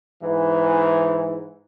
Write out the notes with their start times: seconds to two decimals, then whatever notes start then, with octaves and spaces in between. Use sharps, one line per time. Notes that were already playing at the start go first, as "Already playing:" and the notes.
0.22 G#2 E3